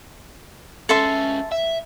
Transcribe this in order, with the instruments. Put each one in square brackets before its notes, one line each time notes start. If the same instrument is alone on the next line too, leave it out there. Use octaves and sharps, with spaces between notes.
[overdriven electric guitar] C#2 C#4 [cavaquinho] A4 E5 C6
[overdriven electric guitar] E5